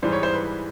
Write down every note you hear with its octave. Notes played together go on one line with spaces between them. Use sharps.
G#2 E3 G3 C5
C#5
C5
B4